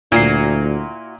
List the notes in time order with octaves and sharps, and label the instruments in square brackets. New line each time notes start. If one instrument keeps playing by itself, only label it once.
[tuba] D2 [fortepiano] A#2 [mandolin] E4 F#4 C6